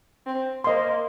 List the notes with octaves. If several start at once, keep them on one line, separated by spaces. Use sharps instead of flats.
C4
A#3 C5 D#5 C6